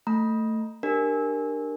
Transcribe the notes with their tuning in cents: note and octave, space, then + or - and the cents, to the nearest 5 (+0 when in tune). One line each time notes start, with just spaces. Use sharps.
A3 +15 A#5 +0
D4 +25 G4 +10 A#4 +0